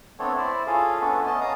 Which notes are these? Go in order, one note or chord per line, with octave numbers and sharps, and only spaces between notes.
A3 B3 C4 D4 A4 C#5
E4 C5 D5
C#4 F4 G#4 A4 F5
A3 B3 C#4 D4 A4
B3 C#4 D#5 A5
C#4 F5 A#5 D#6